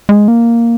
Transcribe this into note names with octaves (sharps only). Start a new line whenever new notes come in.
G#3
A#3